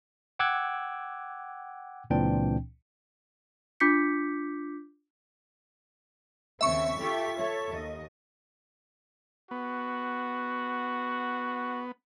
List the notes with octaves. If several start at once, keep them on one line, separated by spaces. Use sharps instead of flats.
F#5 G5 D6 E6 F#6 G#6
C#2 A#2 E3 C4 D4 G5
D4 F4 D6 G6 B6 C#7
D#2 C#3 C4 E5 C#6
F4 G4 A4
A4 C#5
D#2 D#5
B3 F#4